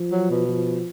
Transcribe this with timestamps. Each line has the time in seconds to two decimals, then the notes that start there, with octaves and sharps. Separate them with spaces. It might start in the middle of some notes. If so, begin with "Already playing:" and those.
Already playing: F3
0.11 F#3
0.31 B2
0.49 F3